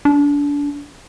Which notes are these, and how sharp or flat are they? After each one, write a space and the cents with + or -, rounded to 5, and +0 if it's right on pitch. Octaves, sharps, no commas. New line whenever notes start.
D4 -30